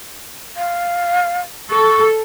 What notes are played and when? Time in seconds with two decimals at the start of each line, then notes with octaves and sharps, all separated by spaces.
0.57 F5
1.70 A4 C#6